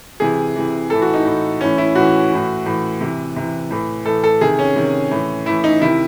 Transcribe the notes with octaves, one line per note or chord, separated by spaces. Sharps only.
C3 E3 G#4
C3 E3
A2 E3 A4
F#4
D#4
A2 E3
A2 E3 C#4
E4
A2 E3 F#4
A2 E3
A2 E3
C3 E3
C3 E3
A2 E3
A2 E3 A4
A4
C3 D#3 G#4
C#4
C3 D#3
A2 E3
A2 E3 E4
D#4
C3 D#3 E4